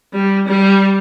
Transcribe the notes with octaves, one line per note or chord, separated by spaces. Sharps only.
G3
G3